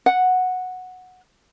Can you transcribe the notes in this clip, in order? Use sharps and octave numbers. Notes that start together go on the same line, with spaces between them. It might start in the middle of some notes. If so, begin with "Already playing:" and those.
F#5